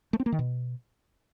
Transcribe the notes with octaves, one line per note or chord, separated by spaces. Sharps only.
A3
C4
A#3
D#3
B2